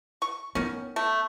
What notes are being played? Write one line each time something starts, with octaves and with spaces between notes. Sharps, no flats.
C#6
D#3 B3 C#4
A3